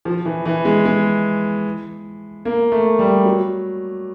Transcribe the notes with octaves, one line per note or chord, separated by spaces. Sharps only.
F3
E3
E3
G#3
G#3
A#3
A3
G3
F#3